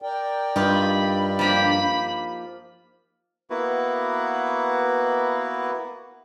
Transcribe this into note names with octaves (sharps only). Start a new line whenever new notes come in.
A#4 D5 G5
G2 D#4 F4 G4 B5
F3 A#3 G4 B5
A#3 B3 E4 F#4 B4